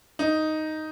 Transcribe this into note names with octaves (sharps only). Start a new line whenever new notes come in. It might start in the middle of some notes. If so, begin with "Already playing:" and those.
D#4